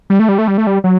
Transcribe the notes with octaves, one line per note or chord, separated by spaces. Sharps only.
G3
A3
G3
A3
G3
A3
G3
F#3